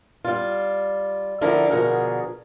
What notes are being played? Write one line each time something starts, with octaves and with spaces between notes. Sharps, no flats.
G3 F4
D3 F3 D4 E4 A4 A#4
B2 D3 F3 G#4 A#4 F#5